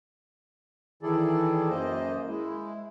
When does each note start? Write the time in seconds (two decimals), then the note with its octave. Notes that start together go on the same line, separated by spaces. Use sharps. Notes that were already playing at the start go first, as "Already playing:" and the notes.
1.03 D#3 E3 E4 G#4 A4 D5
1.69 F#2 A#3 C5 D#5
2.28 G#3 E4